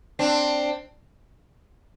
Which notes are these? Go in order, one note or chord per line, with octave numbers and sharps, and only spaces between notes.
C4 D4